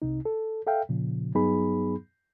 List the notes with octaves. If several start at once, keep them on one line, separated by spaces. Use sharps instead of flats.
C2 C3 D#4
A4
A4 E5 F5 G5
A#2 C#3 F3
G2 F#3 B3 D#4 G#4 B5